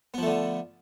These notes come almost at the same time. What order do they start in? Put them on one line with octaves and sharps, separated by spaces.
B3 F3 A3 D3